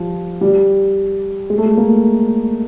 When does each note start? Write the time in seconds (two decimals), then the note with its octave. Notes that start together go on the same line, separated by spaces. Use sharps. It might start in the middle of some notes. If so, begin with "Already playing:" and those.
Already playing: F3 G3
0.41 G3
1.50 G#3
1.58 A3
1.66 G#3
1.77 A#3